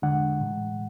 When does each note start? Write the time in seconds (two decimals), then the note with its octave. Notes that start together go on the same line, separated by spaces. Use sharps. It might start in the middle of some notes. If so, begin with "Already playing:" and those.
0.02 E2 D3 G#3 D4 F#5
0.40 A2 E3 G#3